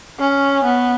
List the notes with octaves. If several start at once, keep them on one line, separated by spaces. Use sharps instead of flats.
C#4
B3